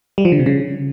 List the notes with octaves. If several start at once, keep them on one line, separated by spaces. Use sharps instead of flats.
G3
F3
D3
C3
C#3